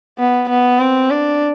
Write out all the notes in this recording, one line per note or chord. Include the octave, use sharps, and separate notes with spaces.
B3
B3
C4
D4